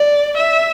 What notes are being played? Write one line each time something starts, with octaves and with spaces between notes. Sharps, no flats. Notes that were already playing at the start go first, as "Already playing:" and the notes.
Already playing: D5
E5